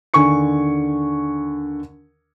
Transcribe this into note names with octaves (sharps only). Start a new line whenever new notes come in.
D#2 D3 G#5 C#6 C#7